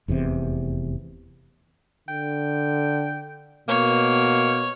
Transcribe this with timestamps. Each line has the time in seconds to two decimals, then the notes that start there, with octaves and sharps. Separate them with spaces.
0.08 F1 E2 A2 C3
2.08 D3 G5
3.68 B2 A#3 C#5